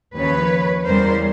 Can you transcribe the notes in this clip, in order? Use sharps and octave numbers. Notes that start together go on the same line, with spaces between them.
D#2 C#3 F3 B4 C#5
E2 C#3 E3 G3 A#4 C5